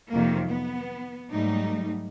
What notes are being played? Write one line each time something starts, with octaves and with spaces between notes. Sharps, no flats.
F2 C3 D#3 F#3 A#3
B3
G#2 F#3 G3 A3 D#4